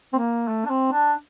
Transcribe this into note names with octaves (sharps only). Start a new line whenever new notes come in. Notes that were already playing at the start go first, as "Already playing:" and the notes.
C4
A#3
A3
D4
C4
D4